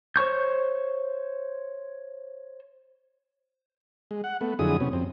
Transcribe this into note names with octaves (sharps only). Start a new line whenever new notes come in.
C5 C#5 C#6 G6
G#3
F#5
A3 B3
F2 D3 F#3 E4 G#4 D#6
C3 B3 C#4
F2 C4